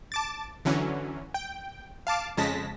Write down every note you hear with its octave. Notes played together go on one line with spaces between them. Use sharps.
A5 D6 A6
D3 E3 F#3 C#4
G5
F5 A5 D6
F2 C#3 G#3 A5 A#6 B6